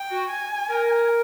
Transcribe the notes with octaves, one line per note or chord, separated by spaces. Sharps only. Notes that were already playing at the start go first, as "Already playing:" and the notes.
Already playing: G5
F#4
G#5
A#4